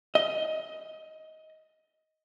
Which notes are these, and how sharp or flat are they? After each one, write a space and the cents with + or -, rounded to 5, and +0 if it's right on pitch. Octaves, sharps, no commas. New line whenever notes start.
D#5 +15